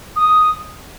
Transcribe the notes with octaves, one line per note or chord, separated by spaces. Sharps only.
D#6